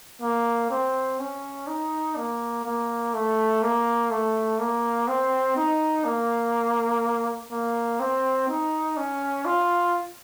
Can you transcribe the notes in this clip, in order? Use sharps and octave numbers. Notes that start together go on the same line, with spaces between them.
A#3
C4
C#4
D#4
A#3
A#3
A3
A#3
A3
A#3
C4
D#4
A#3
A#3
C4
D#4
C#4
F4